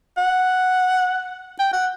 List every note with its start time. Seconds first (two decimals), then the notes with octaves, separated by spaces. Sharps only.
0.18 F#5
1.60 G5
1.73 F#5